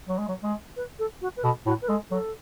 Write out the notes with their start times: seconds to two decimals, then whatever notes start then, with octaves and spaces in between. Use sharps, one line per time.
0.08 F#3
0.18 G#3
0.28 F#3
0.43 G#3
0.76 B4
0.99 A4
1.21 F#4
1.37 B4
1.43 B2 A4
1.66 A2 F#4
1.82 B4
1.88 G#3 A4
2.11 F#3 A4